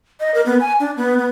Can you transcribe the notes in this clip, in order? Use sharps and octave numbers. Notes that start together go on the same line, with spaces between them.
D#5
A#4
B3
G#5
D4
B3
B3